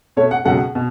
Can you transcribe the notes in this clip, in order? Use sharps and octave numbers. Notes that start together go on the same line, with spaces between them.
B2 A3 C#5
F#5
C#2 B2 F#3 A3 F#5
B2